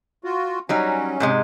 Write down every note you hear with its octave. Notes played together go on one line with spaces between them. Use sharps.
F4 F#4
F#3 G3 C#4 D#4
G#2 C3 G#3